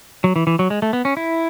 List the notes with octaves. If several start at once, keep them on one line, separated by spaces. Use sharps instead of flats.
F#3
E3
E3
F#3
G#3
A3
B3
C#4
E4